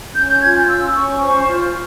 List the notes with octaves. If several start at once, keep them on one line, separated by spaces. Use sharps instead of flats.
C#4 G6
G6
F4 G#6
G6
C#4 E6
C#4 C#6
C5
F4